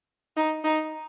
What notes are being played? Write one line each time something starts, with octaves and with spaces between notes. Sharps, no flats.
D#4
D#4